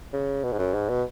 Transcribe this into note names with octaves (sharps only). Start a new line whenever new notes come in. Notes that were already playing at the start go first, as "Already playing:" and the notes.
C#3
B2
G#2
F#2
G#2
B2